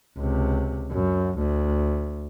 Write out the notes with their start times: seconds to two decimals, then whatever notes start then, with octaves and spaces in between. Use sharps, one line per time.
0.17 C#2 C3
0.92 F#2
1.38 D2